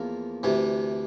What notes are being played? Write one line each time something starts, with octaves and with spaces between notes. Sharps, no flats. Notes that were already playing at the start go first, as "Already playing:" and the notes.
Already playing: E2 F3 A#3 A#4
D2 C3 E3